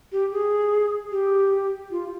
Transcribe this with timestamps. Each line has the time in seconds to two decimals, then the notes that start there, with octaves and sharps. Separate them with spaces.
0.12 G4
0.32 G#4
1.11 G4
1.91 F4